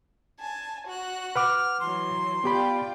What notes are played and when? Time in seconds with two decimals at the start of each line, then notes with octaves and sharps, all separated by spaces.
0.38 G#5 A5
0.86 F#4 F#6
1.36 B4 F#5 D6 F6
1.80 E3 F#3 C6
2.44 B3 F4 G4 D5 G5 B5